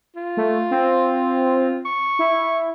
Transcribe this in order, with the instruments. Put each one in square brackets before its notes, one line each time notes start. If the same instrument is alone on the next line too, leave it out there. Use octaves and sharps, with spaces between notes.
[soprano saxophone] F4
[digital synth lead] A3
C4
[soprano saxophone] C#6
[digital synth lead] E4